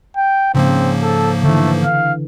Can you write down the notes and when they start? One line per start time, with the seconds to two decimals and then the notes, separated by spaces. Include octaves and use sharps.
0.17 G5
0.55 G#2 C#3 F3 A#3 C4
1.03 A4
1.44 D3 E3 A3
1.84 F5